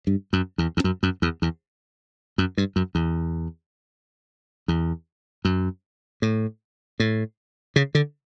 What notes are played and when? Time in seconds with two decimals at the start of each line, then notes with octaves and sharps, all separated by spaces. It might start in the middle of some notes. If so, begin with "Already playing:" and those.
0.07 G2
0.33 F#2
0.58 E2
0.77 E2
0.84 F#2
1.03 F#2
1.22 E2
1.42 E2
2.38 F#2
2.58 G2
2.76 F#2
2.95 E2
4.68 E2
5.45 F#2
6.22 A2
7.00 A2
7.76 C#3
7.95 D3